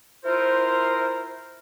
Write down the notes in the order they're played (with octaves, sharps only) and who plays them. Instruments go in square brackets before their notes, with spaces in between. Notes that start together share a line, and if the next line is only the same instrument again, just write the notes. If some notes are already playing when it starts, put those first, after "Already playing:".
[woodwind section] E4 F4 A#4 C5